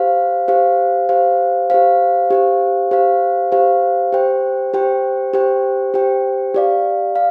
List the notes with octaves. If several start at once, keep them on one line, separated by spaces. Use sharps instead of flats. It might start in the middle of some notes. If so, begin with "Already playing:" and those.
Already playing: G4 C5 F5
G4 C5 F5
G4 C5 F5
G4 C5 F5
G4 C5 F5
G4 C5 F5
G4 C5 F5
G4 C5 G5
G4 C5 G5
G4 C5 G5
G4 C5 G5
G4 D5 F5
F5